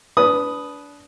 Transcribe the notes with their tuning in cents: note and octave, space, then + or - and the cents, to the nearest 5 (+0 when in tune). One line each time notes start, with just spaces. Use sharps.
D4 -30 B4 +0 D#6 +0